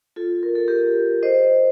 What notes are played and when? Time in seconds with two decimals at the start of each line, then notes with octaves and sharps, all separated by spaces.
0.16 F4 A4
0.43 A#4
0.55 A4
0.68 G4 A#4
1.23 C5 D#5